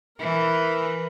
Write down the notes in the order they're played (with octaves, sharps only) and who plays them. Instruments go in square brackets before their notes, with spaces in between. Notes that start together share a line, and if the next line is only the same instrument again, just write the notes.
[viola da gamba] E3 [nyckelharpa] A#4 B4